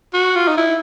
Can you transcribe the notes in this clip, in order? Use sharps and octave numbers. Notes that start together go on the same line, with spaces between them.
F#4
F4
D#4
E4